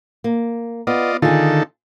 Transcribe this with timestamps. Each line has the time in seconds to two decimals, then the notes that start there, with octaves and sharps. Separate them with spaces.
0.24 A#3
0.87 B3 F4 D5 D#5
1.22 D3 D#3 F4 G#4 A4